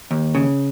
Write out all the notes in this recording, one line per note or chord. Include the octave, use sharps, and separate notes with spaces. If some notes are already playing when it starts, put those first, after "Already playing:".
D#2
C#3